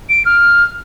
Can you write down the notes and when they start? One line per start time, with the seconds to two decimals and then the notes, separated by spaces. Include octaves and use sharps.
0.09 D7
0.25 F6